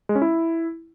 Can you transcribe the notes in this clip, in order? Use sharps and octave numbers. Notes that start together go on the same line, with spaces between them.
G#3
C#4
E4